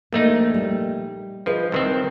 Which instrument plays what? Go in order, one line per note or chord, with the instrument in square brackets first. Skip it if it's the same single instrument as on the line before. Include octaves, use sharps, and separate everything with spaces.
[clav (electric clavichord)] A#1 A3 D#4 [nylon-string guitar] A#3
[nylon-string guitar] G3
[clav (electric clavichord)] F3 [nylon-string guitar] G#4 B4 D#5
[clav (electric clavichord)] C2 D#3 C4